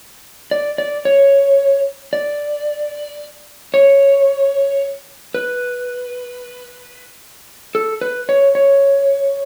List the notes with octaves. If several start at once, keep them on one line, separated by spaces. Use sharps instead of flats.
D5
D5
C#5
D5
C#5
B4
A4
B4
C#5
C#5